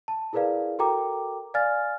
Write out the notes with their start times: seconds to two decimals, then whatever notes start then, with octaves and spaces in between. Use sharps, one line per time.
0.08 A5
0.33 E4 G#4 A#4 B4 D5 F5
0.79 F#4 A4 A#4 G5 A#5 D6
1.54 D5 F5 G#5 F6 A6